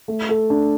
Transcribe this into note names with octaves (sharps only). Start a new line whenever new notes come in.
A3
A4
D4